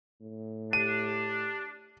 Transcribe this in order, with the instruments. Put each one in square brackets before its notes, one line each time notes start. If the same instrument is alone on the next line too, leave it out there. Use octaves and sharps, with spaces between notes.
[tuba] A2
[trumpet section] D4 [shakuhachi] G4 [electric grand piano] D#7